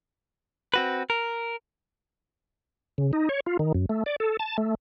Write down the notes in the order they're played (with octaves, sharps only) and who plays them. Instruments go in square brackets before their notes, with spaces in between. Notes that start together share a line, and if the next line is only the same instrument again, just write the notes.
[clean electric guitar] C4 F#4 B4
A#4
[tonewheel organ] C#3
D#4
C#5
F4
D#3
F#2
A3
D5
A4
A5
A3